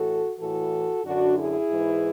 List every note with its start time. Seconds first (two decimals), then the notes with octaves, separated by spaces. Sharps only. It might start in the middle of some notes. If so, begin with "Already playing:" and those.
Already playing: A2 E3 F#4 A4
0.39 A2 E3 F#4 A4
1.05 F#2 D3 D4 F#4
1.38 E4 G#4
1.70 G#2 E3